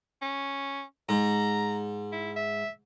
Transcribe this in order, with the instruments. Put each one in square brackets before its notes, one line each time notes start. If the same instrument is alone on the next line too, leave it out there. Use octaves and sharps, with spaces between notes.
[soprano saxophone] C#4
[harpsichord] G#2 [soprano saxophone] A#5
[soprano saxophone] E4
E5